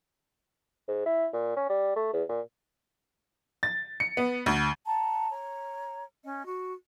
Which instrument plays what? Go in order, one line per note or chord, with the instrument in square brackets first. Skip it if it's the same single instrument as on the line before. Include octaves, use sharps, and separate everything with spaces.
[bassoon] G#2
E4
A#2
C#4
G3
A3
E2
A#2
[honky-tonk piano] A6
C#7
B3
D2
[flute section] F#5 A5 A#5
C#5 A#5
C#4 D#5
F#4